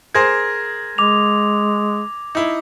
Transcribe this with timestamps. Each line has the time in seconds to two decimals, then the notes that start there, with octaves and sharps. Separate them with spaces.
0.15 G#4 A#4 C5 G#6 A#6
0.98 G#3 D6 F7
2.35 D#4 E4